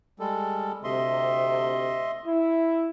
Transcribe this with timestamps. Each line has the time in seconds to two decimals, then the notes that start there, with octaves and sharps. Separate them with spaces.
0.20 G3 G#3 A4
0.84 D2 C3 D#5 E5 C6
2.26 E4